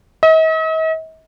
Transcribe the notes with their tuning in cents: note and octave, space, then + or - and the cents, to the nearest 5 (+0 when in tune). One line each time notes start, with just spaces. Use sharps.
D#5 +45